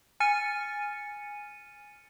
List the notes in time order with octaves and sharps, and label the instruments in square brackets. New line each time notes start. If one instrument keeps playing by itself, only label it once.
[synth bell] G#5 F6 A6 C#7 D#7